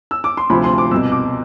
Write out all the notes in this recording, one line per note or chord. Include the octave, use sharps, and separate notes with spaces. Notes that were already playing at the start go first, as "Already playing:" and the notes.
E6
D6
C6
D2 C3 F3 B5
C6
D6
C2 B2 E6
D6